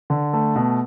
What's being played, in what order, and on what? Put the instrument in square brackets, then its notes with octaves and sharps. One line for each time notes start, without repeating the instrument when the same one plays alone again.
[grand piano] D3
A3
B2